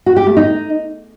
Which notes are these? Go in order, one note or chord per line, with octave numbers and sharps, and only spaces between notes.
F#4
G4
A3
D#4